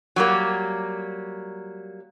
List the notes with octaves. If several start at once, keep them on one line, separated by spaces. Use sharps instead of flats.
F#3 G3 A#3